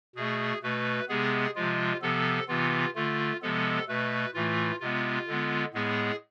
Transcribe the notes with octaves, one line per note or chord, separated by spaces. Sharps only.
B2 A3 G#4
B2 A3 B4
C3 G#3 B3 G#4
C3 F3 G#3 F4
C3 F3 B3 A4
C3 E3 B3 F4
D3 A3 F4
C3 F3 G#3 B3 A4
B2 A3 B4
A2 E3 A3 F4
C3 G#3 B3 F4
D3 G#3 B3
A2 G#3 B3 G#4